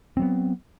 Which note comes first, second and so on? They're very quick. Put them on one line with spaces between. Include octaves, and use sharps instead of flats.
C4 F#3 B3